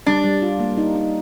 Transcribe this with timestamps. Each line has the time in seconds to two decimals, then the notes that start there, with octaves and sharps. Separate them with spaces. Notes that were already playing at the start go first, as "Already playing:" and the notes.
0.06 G3 D4
0.24 G3
0.42 F4
0.60 A#3
0.77 D#4
0.95 D#4